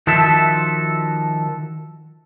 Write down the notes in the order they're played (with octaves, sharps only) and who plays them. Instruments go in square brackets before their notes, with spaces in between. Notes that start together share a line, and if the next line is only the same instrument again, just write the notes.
[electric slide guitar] D#3 F3 F#4 A4 E5